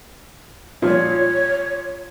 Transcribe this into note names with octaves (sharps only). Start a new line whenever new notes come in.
A#2 F3 G3 C#5